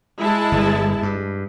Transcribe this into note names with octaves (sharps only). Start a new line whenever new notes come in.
G#3 E4 A5
G1
G2